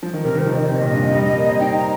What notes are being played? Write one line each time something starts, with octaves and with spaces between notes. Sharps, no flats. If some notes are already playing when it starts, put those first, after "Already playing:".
F3
D#3
C3 A#4
D#3
C5
F3
D#3 D#5
C3 C5
A#2 D#5
G2
F2
G3
G3
A#3
C4
D#4 G5
A#5